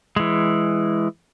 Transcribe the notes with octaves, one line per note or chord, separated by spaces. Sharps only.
E3 G#3